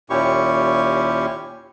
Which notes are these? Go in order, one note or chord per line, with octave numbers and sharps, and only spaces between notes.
D#2 A#2 C#4 E4 G4 C#6